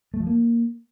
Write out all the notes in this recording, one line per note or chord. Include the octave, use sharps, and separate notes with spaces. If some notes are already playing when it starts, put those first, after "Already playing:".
A3
F3
A#3